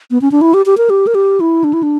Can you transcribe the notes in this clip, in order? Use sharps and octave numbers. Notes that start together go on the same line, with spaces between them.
B3
C#4
D4
E4
G4
G4
A#4
G4
A#4
G4
E4
D4
E4
D4